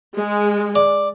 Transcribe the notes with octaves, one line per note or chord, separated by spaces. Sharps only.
G#3
D5